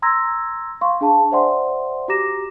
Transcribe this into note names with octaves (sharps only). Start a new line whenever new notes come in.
A#5 C6 E6 G#6 A#6
F5 C6 C#6
D4 G#4 F5 A5
C5 D5 E5 F#5 G#5 C6
F#4 G4 A#5 D6 A#6 E7